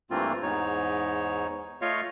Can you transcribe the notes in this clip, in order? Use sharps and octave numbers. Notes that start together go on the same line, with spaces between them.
G2 E3 A3 A#3 C4 F4
E2 G#2 D#4 C#5
A3 F4 C#5 D#5 F5 C#6